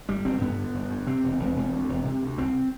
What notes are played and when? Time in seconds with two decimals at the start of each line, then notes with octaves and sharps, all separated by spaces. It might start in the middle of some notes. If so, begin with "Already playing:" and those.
0.08 G1 G3
0.25 G1 C4
0.41 G2 B3
0.58 D3
0.74 G1
0.91 G2
1.07 C3 C4
1.23 E1
1.39 E1
1.56 E1
1.73 D2
1.89 E1
2.05 C3
2.22 D2
2.38 C2 C4